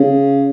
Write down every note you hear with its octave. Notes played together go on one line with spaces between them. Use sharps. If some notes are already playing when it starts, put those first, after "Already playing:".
Already playing: C#3